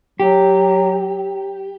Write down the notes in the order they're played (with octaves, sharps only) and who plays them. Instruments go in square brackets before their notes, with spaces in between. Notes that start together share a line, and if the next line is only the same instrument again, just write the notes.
[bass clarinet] F#3 [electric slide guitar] G4